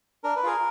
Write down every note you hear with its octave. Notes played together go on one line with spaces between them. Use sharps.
D4 A#4
B4
F4 G#4 A#4